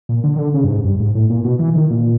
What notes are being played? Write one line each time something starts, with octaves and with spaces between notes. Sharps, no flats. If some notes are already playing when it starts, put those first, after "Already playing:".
A#2
D3
D#3
D3
C#3
G2
G#2
G2
G#2
A2
A#2
B2
E3
D#3
A#2